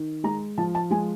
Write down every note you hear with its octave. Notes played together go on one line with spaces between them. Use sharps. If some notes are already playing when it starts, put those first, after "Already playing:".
Already playing: D#3
G#3 A#5
F3 A5
A5
G#3 G#5